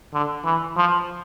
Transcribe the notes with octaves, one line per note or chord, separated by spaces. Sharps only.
D3
E3
F3